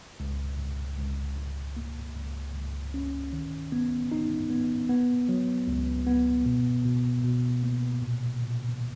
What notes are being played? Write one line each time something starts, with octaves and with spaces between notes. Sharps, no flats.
C#2
C#2
C#2
C#2
A#3
C#2
C#2
C#4
D#3
B3
D#4
B3
B3
F#3
C#2
B3
B2
B2
B2
A#3
A#2
A#2